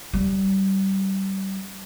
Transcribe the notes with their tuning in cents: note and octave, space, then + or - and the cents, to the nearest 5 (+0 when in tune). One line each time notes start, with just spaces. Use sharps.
G3 -25